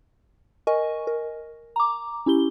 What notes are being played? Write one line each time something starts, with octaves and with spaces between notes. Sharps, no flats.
A#4 D#5 G#5 C#6
A#4
A#5 D6
C#4 E4 G4 G7